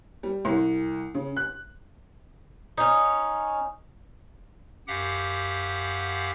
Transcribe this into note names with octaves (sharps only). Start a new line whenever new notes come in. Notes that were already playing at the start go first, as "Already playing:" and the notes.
G3
C2
C#3
F#6
C#4 D#4
F#2 G4 F5 F#5